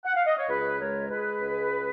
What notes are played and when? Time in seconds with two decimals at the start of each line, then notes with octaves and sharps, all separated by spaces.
0.05 F#5
0.16 F5
0.27 D#5
0.38 C#5
0.49 C#2 G#4 B4
0.79 G#3 A#4 C#5
1.10 G#3 G#4 B4
1.41 C#2